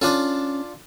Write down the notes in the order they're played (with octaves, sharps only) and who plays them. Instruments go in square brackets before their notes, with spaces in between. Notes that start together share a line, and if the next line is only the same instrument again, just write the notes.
[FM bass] C#4 [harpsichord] D4 F4 A4